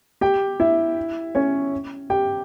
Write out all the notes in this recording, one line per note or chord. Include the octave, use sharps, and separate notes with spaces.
G4 G5
E4 E5
C#4 C#5
G4 G5